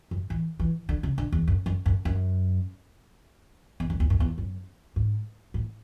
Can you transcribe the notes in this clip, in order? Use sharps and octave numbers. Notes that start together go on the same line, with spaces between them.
F#2
E3
E3
D3
C#3
D3
E2
F#2
F#2
F#2
F#2
E2
F#2
E2
F#2
E2
F#2
G#2
A2